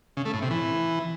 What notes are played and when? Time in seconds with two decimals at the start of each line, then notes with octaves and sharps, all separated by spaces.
0.17 C#3
0.25 A3
0.34 A2
0.42 C3
0.51 E3